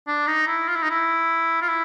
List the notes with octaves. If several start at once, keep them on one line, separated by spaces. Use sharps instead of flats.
D4
D#4
E4
F4
E4
D#4
E4
F4
E4